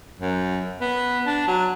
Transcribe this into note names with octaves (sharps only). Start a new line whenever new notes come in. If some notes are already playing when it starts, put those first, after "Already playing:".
F#2
B3
D4
F#3